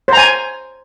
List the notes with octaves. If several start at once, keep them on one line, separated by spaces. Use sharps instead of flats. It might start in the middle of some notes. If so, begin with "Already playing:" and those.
C5 G#5 A#5